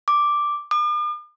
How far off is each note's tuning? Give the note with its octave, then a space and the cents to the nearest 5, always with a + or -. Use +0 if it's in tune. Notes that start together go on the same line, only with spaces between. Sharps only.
D6 +0
D6 +45